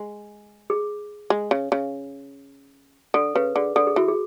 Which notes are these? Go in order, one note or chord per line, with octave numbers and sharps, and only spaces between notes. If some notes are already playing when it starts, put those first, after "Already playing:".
Already playing: G#3
G#4
G#3
C#3
C#3
D3 A4
C#3 B4
D3 G#4
D3 A4
G#4
E3 F#4
G#4